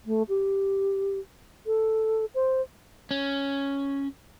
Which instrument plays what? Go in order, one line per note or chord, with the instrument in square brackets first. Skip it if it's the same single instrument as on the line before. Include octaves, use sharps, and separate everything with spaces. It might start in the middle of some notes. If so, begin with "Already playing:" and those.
[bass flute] A3
G4
A4
C5
[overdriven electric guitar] C#4